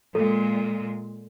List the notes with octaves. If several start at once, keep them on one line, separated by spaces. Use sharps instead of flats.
A#2 G#3 A4